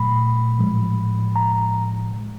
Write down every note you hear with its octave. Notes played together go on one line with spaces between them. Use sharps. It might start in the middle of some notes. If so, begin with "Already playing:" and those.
Already playing: A#2 F#3 A3 B5
A2 F3 G#3
A#5